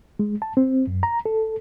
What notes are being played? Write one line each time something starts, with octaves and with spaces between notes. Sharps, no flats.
G#3
A5
C4
F#2
A#5
A4